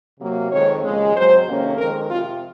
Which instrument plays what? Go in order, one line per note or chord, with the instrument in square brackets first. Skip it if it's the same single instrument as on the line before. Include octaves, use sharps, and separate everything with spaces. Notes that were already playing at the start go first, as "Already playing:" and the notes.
[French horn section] C3 F#3 A#3
F2 D#3 G#3 C4 C#5
D#2 C#3 F3 G#3
G#2 F#3 C4 C5
F2 C3 D#3 A#3 C#4
F2 D#3 G#3 C4 A#4
C3 F3 C4 F4